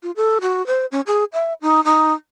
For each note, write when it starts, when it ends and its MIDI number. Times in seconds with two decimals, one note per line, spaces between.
0.03 0.11 65
0.16 0.38 69
0.41 0.65 66
0.67 0.86 72
0.92 1.01 61
1.07 1.24 68
1.33 1.53 76
1.62 1.84 63
1.85 2.13 63